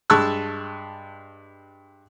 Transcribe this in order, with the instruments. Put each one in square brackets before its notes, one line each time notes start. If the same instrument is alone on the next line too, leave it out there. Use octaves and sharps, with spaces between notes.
[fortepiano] G2 G#3 A5 C#6 E6 F#6